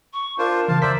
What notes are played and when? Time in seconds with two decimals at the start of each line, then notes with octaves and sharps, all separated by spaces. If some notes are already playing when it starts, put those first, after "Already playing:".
0.13 C#6
0.38 D4 F4 A#4 C5
0.68 C#3 E3 F5 A5
0.82 A#4 C5 D5 E5 A#5 B6